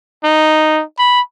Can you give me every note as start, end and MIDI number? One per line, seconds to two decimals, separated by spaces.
0.25 0.82 63
0.99 1.21 83